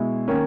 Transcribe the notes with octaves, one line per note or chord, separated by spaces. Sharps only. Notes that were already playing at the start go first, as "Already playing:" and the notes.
Already playing: B2 G#3 E4
D#3 A#3 C#4